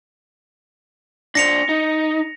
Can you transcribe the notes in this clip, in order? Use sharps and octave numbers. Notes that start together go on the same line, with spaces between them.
D4 C5 A#6 C#7 F7
D#4